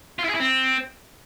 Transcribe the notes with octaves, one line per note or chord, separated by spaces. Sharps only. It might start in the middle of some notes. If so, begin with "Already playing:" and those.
F4
E4
G#4
E4
C4